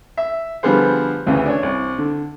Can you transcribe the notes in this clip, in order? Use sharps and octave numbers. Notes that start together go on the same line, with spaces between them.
E5
D3 F3 G3 B3 G#4 C5
D2 C#3 E3
D4 C#5
C2
D3